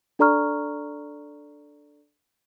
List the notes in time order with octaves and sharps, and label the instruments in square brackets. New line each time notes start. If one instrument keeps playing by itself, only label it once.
[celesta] D4 A4 D5 A#5 C#6 F6